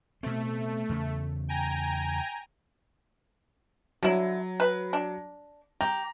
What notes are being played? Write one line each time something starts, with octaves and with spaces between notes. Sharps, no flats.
B2 A3 C4
E2 C#3
G5 G#5 A#5
D3 F#3 E4
B4
D4
G4 A#5